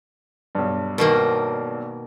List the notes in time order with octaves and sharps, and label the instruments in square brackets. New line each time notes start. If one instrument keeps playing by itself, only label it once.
[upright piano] B1 G2
[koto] B2 D#3 A#3